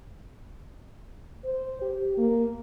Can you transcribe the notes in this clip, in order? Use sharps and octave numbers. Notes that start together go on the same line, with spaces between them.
C5
G4
A#3